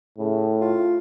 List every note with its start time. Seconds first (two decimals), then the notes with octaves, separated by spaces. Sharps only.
0.18 A2 C#3
0.61 F4